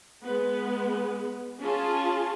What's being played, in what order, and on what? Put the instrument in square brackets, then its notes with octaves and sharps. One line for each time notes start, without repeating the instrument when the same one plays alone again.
[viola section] G#3 B3
C#4 F4 G#4 G#5 A5